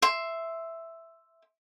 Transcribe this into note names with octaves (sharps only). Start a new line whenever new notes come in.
E5 C6